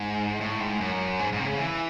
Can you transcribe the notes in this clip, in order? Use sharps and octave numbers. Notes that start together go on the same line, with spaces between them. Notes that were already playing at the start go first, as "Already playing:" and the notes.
Already playing: G#2
A2
G#2
F#2
G#2
G#2
C3
C#3
E3